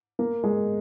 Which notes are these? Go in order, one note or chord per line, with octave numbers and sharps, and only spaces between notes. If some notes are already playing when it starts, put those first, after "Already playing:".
A#3
G#3